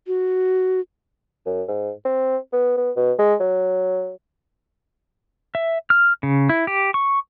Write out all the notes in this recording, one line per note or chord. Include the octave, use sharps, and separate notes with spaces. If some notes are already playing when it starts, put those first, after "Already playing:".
F#4
F#2
G#2
C4
B3
B3
B2
G#3
F#3
E5
F6
C#3
E4
G4
C#6